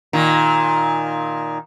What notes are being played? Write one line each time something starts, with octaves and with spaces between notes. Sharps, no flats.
A#2 D#3